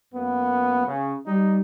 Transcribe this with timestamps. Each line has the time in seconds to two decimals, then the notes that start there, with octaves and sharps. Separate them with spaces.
0.13 F#2 A#3 B3
0.86 C#3
1.26 G3 D#4